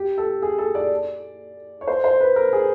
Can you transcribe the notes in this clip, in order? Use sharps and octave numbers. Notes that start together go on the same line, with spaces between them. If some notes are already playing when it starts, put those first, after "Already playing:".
Already playing: G4
A4
G#4
A4
D5
C#5
C5
C5
B4
A#4
G#4